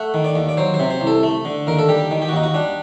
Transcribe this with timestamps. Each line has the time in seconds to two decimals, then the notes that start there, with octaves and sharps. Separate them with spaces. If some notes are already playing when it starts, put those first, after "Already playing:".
Already playing: A3 F#5
0.14 D#3
0.24 D5
0.36 D#2
0.49 D5
0.57 F#3 C5
0.74 C5
0.79 C3
0.90 C5
1.01 C2
1.07 A4
1.23 A3
1.45 D3
1.67 D#2 A#4
1.79 A4
1.89 G3 G4
2.11 D#3
2.22 G4
2.29 F#4
2.33 D#2 D#4
2.44 F#4
2.54 G3 D4